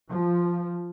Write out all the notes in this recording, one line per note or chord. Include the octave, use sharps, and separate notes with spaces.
F3